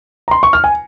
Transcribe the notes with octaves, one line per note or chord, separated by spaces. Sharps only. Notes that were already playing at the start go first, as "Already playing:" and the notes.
A#5
C6
C#6
F6
G#5